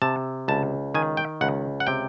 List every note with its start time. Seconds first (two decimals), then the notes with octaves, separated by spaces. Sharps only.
0.02 C3 A5
0.48 C#2 A5
0.95 D#3 G#5
1.17 G5
1.41 C#2 F#5
1.80 F#5
1.87 C3 G5